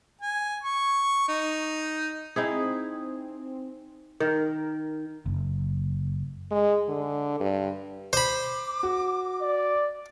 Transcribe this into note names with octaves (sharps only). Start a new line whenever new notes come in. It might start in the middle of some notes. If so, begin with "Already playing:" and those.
G#5
C#6
D#4
C4 D#4 E4 G#4
D#3 A#4
F#1
G#3
D3
G2
C5 B5 D6
F#4
D5